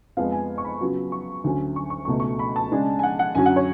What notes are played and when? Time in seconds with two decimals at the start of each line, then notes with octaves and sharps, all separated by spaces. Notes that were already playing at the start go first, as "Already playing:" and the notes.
0.17 F2 F3 G#3 B3 F5
0.32 G#5
0.58 C#6
0.64 B5
0.81 C#3 F#3 B3 F4
1.12 C#6
1.44 D2 D3 F#3 C#4
1.76 C#6
1.90 C#6
2.05 C#2 B2 A3 C#6
2.20 C#6
2.39 B5
2.56 A5
2.72 C#3 G#3 D4
2.99 G#5
3.03 F#5
3.19 F#5
3.35 F#2 D3 F#3 C#4 G#5
3.46 F#5
3.56 C#5